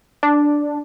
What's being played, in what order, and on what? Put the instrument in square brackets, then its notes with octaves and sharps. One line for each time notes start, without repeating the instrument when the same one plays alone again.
[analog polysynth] D4